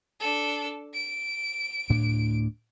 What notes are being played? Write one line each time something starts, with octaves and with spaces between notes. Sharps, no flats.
D4 A4
D7
D2 A2 D4